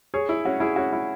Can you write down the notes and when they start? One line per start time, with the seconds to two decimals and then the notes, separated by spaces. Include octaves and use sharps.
0.14 G#4 C#5
0.29 E4
0.45 C#4 F#4
0.60 E4 G#4
0.76 C#4 F#4
0.93 E4